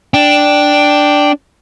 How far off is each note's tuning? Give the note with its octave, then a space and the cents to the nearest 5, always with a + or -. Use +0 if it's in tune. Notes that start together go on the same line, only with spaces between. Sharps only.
D4 +0 G5 +0